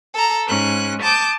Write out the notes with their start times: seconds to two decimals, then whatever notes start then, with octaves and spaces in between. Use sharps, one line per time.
0.14 A4 A#5
0.47 G#2 C#4 F#6
1.02 A5 D6 D#6 G6